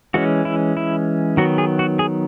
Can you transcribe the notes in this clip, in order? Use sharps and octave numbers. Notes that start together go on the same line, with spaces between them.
E3 G#3 C#4 F#4
E4
E4
D#3 F#3 B3 F#4
G#4
F#4
G#4